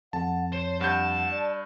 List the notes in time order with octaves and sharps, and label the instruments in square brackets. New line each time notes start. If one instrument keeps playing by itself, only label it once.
[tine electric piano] F2 [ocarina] F#5 [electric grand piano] A5
[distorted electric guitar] C5 [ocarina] C#5
[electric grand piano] G2 G6 [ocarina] F#5 [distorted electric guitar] A5
[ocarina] D5